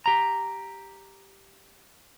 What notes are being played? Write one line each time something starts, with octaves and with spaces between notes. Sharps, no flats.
G4 A#5